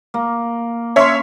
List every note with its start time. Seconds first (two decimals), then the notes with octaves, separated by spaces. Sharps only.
0.14 A#3
0.96 C#4 C#5 E5 C6